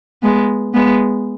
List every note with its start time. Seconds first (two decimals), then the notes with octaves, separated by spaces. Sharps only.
0.23 G#3 B3
0.74 G#3 B3